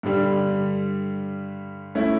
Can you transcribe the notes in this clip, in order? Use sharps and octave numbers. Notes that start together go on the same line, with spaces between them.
G2 D3 G3
A3 C#4 E4